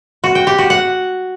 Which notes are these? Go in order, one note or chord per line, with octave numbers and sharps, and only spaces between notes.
F#4
G5
G4
F#4
F#5